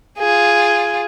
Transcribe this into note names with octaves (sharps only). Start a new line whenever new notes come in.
F4 G#4